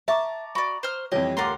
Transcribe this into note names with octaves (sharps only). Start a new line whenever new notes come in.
E5 A5 A#5 C#6 D6
F#4 D5 B5
C5 F6
F2 E3 G3 G4 C#5 D#5
D2 F4 A#4 F#5 C6 D6